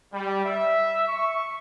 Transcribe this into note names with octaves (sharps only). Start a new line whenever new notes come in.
G3
E5
C#6